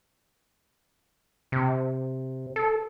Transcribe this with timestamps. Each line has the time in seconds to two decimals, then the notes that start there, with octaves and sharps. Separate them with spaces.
1.52 C3
2.56 A4